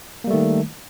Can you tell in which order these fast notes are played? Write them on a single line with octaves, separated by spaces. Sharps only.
A#3 G3 A3 D#3